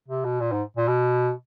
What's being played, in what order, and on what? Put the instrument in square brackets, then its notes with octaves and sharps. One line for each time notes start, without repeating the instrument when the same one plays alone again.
[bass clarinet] C3
B2
A#2
G#2
A#2
B2